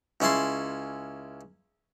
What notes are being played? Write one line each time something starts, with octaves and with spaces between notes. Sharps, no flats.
C#2 C#4 E4 A5 C6